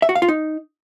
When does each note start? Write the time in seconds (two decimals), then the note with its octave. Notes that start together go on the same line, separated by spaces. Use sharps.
0.02 E5
0.09 F#4
0.15 F5
0.22 F4
0.28 D#4